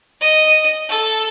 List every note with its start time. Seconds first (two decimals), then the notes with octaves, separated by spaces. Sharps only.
0.19 D#5
0.87 A4